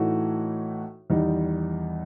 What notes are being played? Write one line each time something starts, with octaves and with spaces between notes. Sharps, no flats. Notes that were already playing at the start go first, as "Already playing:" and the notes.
Already playing: A2 E3 A3 D#4 F#4
E2 D#3 G3 D#4